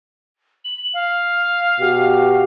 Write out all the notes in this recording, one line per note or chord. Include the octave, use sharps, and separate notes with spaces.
F#7
F5
B2 F#4 G4